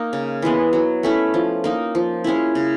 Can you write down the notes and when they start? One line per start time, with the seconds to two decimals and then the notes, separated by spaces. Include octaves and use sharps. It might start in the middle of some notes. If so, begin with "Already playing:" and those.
Already playing: A#3 D#4
0.13 C#3
0.42 E3 G#3 B3
0.73 F#3
1.03 A3 C#4 E4
1.34 F3
1.64 A#3 D#4
1.95 F3
2.24 G#3 C#4 E4
2.55 C#3